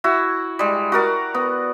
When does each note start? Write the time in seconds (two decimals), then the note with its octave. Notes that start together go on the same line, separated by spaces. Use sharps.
0.04 E4 F#4
0.59 G3 G#3
0.92 F#4 A#4 D5
1.34 B3